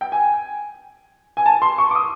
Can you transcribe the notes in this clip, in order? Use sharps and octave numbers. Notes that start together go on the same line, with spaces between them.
G5
G#5
G#5
A5
C6
C#6
D6
D#6